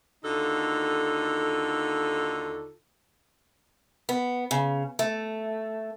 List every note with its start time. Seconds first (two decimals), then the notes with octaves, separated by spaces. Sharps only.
0.24 D#2 D3 D#4 F4 F#4 A4
4.09 B3
4.51 C#3
4.99 A3